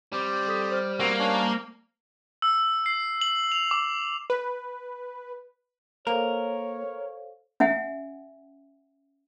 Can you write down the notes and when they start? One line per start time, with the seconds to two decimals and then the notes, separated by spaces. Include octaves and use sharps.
0.13 G3 C4 G4 D5
0.48 A4 D#6 B6
0.72 C5 F6
0.99 A#3 C4 F#4 E6
1.19 C#4 D4 C#5
2.42 E6
2.86 C7
3.21 F#7
3.52 F7
3.71 D6
4.30 B4
6.07 A#3 A4 A#4 C5 C#5 F5
7.60 C#4 E5 F#5 G#5